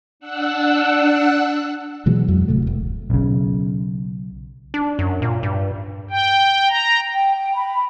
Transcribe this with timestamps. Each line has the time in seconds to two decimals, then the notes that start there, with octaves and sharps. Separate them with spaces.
0.20 D4 F#5 E6 F#6
2.06 B2 E3 F#3 G#3
2.28 F2 F#3
2.48 D1 C3 A3
2.67 F1
3.10 B1 C#3
4.74 D4
4.99 F#2
5.22 A#2
5.43 G2
6.11 G5
6.69 A#5
7.13 G5
7.38 G5
7.55 B5